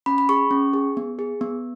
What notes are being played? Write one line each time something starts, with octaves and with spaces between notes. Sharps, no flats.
C#4 B5
B5
G#4 C#6
C#4
G#4
B3
G#4
B3